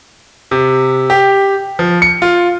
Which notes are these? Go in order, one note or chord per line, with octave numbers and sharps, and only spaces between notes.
C3
G4
F3
C#7
F4